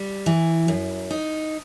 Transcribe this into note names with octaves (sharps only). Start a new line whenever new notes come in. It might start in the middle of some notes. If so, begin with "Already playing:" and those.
Already playing: G3
E3
F#2
D#4